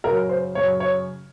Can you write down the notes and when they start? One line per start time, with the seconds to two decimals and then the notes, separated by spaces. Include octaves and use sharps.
0.04 F#2 C#3 F#3 A#4
0.29 C5
0.55 F#2 C#3 F#3 C#5
0.80 C#5